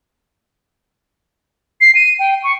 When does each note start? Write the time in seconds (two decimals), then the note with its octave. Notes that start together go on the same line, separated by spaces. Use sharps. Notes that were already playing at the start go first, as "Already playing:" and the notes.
1.81 C7
1.95 D#7
2.19 G5
2.44 C#6